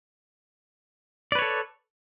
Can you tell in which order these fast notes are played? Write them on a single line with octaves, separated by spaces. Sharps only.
D5 B4 C#5 A4